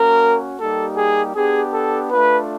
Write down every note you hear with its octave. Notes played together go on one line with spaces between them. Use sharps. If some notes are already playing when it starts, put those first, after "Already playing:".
Already playing: A#3 C#4 F#4 A#4
G3 A#3 D#4 G4 A4
G#4
B3 D4 G4 G#4
A4
A3 D4 F4 B4